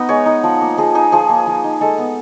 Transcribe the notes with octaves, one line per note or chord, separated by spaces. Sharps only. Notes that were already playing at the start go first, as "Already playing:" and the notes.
Already playing: B3 D#4 D#5
G#3 C#5
D#4
F3
A#3
F3 G#4
D#4 G#4
F3 G#4
A#3
F3
D#4
G#3 A4
B3